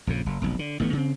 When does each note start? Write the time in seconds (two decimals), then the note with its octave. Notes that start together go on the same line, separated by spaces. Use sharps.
0.07 A#1 F2 C#3
0.26 F#1
0.42 F1 B1
0.59 D3
0.80 A1 D#3 A3 B3
0.93 C#3 C4